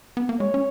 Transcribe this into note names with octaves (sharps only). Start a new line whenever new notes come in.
B3
A#3
G#3 C#5
C#4